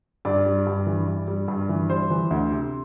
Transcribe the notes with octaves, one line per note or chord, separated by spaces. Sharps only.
G2 D5
G3
G2
E3
G2
G3
G2
E3
G3 C5
E3
D2
C3